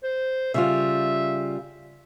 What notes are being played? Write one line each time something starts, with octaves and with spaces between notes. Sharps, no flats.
C5
C#3 G3 F4 E5